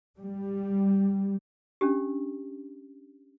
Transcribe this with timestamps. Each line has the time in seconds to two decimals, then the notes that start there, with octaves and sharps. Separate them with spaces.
0.19 G3
1.81 C#4 D4 G4